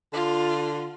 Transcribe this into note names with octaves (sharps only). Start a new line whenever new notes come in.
D3 F4